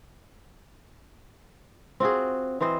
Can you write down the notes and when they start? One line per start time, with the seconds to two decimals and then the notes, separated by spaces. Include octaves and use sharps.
2.00 C4 F4 F#4 G#4
2.61 E3 C4 C5 D#5